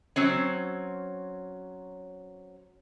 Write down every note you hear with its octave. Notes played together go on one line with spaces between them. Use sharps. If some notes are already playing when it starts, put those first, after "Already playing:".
F#3 C4 C#4